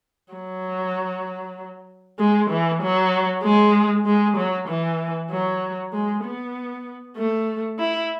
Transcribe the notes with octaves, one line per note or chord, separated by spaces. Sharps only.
F#3
G#3
E3
F#3
G#3
G#3
F#3
E3
F#3
G#3
B3
A3
E4